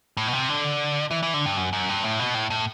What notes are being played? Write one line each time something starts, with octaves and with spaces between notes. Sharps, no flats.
A2
B2
C3
D3
E3
E3
D3
G2
F#2
F#2
G2
A2
B2
A2
A2